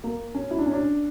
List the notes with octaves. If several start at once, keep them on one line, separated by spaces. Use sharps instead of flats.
A#3
C#4
E4
D4
C#4
D4